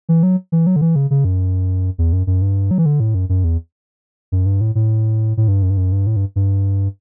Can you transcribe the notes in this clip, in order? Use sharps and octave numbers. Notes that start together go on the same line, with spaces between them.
E3
F#3
E3
F#3
D3
E3
C#3
C#3
F#2
E2
F#2
F#2
G2
F#3
E3
D3
A2
F#2
F#2
E2
F#2
G2
A2
A2
A2
G2
F#2
G2
F#2
G2
A2
G2
G2